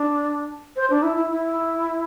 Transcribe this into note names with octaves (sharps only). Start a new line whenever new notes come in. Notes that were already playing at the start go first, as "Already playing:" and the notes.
Already playing: D4
C5
D4
E4
E4
E4